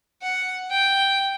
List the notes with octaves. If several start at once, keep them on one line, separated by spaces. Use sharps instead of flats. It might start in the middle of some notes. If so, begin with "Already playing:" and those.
F#5
G5